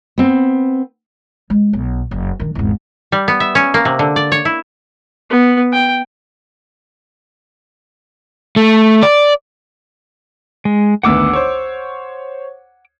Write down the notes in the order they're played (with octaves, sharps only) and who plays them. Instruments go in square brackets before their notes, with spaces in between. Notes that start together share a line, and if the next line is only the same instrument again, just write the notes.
[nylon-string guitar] B3 C4
[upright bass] G#3
B1
F#1
D#3 D4
G#1 E2
[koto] G3
B3
E5
C#4
A#3
C3
D3
D5
C#5
E4
[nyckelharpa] B3
G5
[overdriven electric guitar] A3
D5
[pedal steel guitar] G#3
[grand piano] G#1 D2 B3 [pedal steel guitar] F#5 D6 E6
[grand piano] C5 C#5